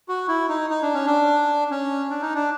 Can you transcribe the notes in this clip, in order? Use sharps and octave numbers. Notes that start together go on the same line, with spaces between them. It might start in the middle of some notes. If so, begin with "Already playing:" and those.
F#4
E4
D#4
D#4
D4
C#4
D4
C#4
D4
D#4
D4